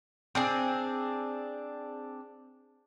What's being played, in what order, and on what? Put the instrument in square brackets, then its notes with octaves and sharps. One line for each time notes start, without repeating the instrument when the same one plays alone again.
[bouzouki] C4 D4 G#4